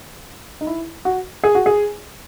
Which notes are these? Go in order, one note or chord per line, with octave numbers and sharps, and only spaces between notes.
D#4
E4
F#4
G#4
F#4
G#4